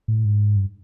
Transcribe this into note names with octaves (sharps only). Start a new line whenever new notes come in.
A2
G#2
G2